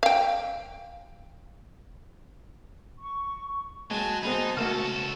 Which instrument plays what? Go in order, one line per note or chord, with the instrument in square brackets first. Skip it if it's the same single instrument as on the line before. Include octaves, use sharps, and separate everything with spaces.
[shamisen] F5 G5
[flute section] C#6
[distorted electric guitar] F#3 [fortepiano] G#3 [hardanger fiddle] G#5 [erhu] A5
[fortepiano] B1 G#3 B5 [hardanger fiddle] C4 G#5 [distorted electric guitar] D#4 [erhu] A5
[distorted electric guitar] C#2 A4 [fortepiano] A3 A#3 F6 [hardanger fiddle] F#4